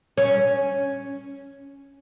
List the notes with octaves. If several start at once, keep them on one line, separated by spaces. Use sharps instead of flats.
C#4